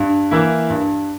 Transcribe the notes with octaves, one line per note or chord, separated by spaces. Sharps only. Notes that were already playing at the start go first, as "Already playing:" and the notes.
Already playing: G2
E3 A#3 E4
G2